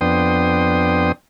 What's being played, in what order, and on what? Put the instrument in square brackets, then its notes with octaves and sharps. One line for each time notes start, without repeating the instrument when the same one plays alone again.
[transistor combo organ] F2 B3 D4 G5 C6 D#6